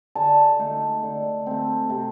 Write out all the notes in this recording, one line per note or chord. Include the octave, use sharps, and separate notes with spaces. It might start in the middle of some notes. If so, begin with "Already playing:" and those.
D3 A5
A3 D#4
D3
A3 C4
C3